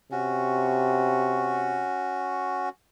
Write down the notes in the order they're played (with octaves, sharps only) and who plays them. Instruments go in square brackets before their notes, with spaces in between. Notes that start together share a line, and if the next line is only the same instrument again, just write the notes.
[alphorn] C3 [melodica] C#4 F#4